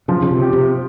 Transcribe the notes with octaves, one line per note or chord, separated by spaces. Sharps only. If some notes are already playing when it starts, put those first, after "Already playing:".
C#3 F3
C#3
C3
G4
C3